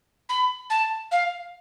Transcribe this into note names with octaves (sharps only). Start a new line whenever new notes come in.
B5
A5
F5